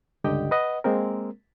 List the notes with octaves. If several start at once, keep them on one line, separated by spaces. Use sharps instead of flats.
C#2 G2 D3 G4 D#5 G5
B4 D#5 F#5
G#3 A#3 C4 A#4